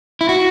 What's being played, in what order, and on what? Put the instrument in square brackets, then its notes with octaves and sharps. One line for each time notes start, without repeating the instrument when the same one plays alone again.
[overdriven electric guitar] E4
F#4